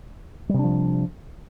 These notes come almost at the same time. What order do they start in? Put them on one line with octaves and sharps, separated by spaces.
G3 C3 D4 F3